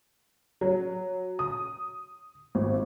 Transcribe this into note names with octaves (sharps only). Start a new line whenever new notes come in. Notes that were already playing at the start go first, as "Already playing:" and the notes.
F#3
D#6
G#1